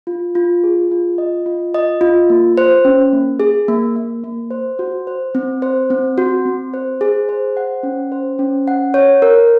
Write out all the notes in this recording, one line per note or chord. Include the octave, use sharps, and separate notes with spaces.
F4
F4
G#4
F4
D#5
F4
D#5
F4
A#3
C5
C#4
A#3
G#4
A#3
A#3
A#3
C5
F#4
C5
C4
C5
C4
F#4
C4
C5
G#4
C5
F#5
C#4
C5
C#4
F#5
C#5
A#4